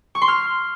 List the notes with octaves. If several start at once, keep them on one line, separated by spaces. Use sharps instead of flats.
C#6
C6
F6